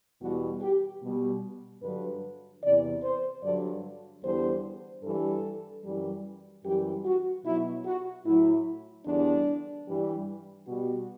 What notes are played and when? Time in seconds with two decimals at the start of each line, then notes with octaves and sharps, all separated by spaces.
0.22 E2 B2 G3 F#4
0.62 G4
1.03 B2 G3
1.83 G2 D3 F#3 B4
2.63 E2 C3 E3 D5
3.03 C5
3.43 G2 D3 F#3 D5
4.24 E2 D3 G3 C5
5.04 G2 E3 G3 A4
5.85 F#2 E3 G3
6.65 F#2 E3 G3 G4
7.06 F#4
7.45 B2 F#3 E4
7.86 F#4
8.26 A2 F#3 E4
9.06 E2 D3 G3 D4
9.87 G2 E3 G3
10.68 B2 G3 F#4